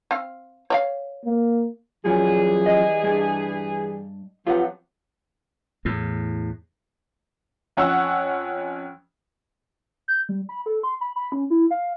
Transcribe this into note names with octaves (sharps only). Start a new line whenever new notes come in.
C4 F5
C#5 D5 F5
A#3
F#2 E3 F3 G3 C#4 G#4
D#5
G2 D4
F3 F#3 C4 F4 G4 B4 F#5
E2 A2
F2 C#4 F#5 C#6 E6
G6
G3
B5
A4
C6
B5
B5
C#4
E4
F5